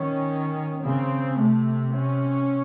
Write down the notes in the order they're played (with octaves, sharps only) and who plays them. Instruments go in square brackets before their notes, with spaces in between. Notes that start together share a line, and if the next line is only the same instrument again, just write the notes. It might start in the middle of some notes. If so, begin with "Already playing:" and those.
Already playing: [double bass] D#3 [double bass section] C#4
[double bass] C#3 [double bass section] C4
[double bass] C3 [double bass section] A3
[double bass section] C#4